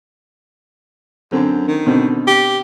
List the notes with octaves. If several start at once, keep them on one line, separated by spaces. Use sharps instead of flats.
F#2 D3 C4
D#3
B2 D3 C4
G4